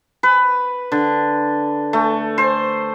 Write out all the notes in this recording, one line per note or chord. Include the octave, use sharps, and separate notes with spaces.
B4
D3
A3
C5